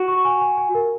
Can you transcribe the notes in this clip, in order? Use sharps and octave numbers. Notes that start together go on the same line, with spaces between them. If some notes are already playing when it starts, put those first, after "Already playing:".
Already playing: F#4
C#6
G#5
G#5
G#5
A#4